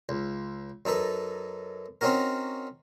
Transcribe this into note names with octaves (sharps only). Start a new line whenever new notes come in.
C#2
F#2 D#4 A4 B4
C4 C#4 D#4 F#4 A#4